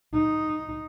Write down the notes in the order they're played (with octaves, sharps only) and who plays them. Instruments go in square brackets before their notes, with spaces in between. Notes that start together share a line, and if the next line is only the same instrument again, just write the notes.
[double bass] D#4